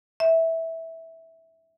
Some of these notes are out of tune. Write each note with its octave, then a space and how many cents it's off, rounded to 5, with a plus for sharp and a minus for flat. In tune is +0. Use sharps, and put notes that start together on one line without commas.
E5 -10